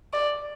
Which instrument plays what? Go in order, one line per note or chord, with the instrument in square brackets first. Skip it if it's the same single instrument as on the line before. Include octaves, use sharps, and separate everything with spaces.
[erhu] D5